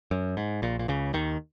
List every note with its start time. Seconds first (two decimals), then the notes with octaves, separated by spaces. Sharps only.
0.11 F#2
0.37 G#2
0.62 A#1 A#2
0.79 A#2
0.88 C#2 C#3
1.14 D#2 D#3